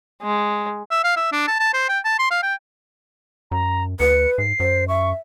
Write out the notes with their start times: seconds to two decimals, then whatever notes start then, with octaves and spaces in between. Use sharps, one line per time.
0.22 G#3
0.91 E5
1.04 F5
1.16 E5
1.32 D4
1.47 A5
1.60 A5
1.74 C5
1.89 G5
2.05 A5
2.19 C6
2.31 F5
2.43 G5
3.51 F#2 A#5
4.00 D2 B4 C#7
4.38 G#2 C7
4.60 F#2 C5
4.88 E5 C#6